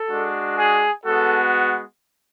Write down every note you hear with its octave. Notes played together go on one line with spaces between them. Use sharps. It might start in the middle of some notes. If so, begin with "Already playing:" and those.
Already playing: A4
G#3 D4 F#4
G#4
G#3 B3 F#4 A4